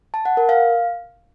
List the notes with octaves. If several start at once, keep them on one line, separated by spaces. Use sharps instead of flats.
A5
F#5
A#4
F5